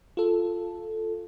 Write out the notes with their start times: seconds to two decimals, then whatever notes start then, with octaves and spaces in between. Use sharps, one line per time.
0.17 F4 A4